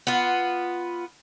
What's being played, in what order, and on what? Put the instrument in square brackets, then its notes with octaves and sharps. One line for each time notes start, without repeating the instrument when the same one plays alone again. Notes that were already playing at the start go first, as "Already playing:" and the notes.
[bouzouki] B3 F4